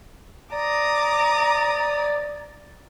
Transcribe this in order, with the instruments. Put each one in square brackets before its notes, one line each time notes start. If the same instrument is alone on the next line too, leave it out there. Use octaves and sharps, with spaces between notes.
[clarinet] D5 [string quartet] A#5 D6 D#6